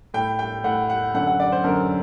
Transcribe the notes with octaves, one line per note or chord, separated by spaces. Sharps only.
A2 G5
G5
A2 F#5
F#5
F#2 D3 F#5
F#5
D5
C5
F#2 D3 A#4